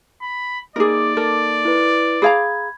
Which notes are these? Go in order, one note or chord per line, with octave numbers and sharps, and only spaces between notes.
B5
A#3 D#4 G#4 A#4 D5 D6
A4 A#4
E4 B4
G#4 F5 A#5 B5 G#6